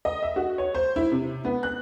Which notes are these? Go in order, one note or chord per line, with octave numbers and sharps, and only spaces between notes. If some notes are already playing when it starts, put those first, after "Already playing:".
D#5
E5
F#4
C#5
C5
E4
C3
B3
F#6